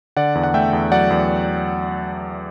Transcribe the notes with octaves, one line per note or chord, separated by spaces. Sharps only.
D3 D5 F#5
E2
F#5
A3 E5 G5
E2
F#3 D5 F#5
E2